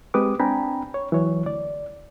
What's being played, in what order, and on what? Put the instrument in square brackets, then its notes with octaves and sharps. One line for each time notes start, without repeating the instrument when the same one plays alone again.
[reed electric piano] G#3 C4 G4 B4 D6 D#6
C4 D4 G5 G#5 A#5 B5
C#5
E3 F#3 C#5
D2 D5